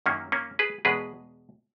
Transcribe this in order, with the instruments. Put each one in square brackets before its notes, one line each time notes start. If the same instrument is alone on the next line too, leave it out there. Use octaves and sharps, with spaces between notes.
[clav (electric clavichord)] F#2 D#3 F#3 A#3 C#4
A#3 C#4
G#4 B4
E2 B2 G#3 G#4 B4